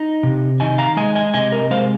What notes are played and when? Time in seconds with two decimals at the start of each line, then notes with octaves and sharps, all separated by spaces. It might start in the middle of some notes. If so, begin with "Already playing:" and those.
Already playing: D#4
0.23 C3
0.60 D#3 D#5 G#5
0.78 F5 A#5
0.97 G#3 D#5 G#5
1.15 D#5 G#5
1.34 C3 D#5 G#5
1.52 A#4 D#5
1.71 G#3 C5 F5